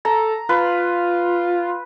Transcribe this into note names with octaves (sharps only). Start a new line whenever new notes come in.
A4 A#5
F4 B4